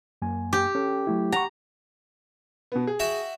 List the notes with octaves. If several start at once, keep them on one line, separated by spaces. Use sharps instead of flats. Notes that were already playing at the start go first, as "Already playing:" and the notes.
F#2 A#3 G#5
G4
C#4 A4
F#3 A3 E4
F#5 A#5 C#6
B2 B3
G#4
F#4 E5 G5